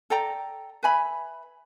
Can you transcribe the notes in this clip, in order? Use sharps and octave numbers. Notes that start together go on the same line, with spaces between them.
A4 D5 G5 A#5
B4 E5 G#5 B5